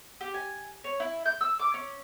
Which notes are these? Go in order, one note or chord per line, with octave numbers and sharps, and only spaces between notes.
G4
G#5
C#5
E4
G6
E6
D6
C#4